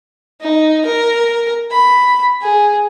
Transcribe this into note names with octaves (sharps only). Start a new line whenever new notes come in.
D#4
A#4
B5
G#4